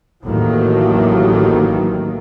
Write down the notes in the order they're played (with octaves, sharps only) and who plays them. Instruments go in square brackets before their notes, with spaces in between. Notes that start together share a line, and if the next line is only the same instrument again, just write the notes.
[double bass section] A1 D#2 D#3 F#3 A3 A#3